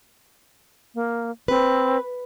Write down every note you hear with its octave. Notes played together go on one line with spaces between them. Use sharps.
A#3
C4 B4